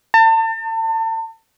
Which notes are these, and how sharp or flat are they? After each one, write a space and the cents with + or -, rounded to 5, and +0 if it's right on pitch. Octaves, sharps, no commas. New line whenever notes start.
A5 +35